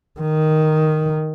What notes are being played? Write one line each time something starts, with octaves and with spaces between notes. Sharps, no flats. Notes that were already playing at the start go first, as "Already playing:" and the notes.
D#3